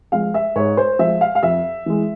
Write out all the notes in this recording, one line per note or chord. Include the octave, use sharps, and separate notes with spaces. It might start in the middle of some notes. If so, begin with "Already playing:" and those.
F3 G#3 F5
E5
G#2 C#5
C5
F3 G#3 E5
F5
F5
F2 E5
E3 G#3